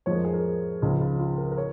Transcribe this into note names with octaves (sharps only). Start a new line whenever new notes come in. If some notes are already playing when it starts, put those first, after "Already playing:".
F2 F3 G#3 C#5
A#4
G#4
A#4
C#2 C#3 F3 G#3 F4
F4
F4
A#4
A#4
C#5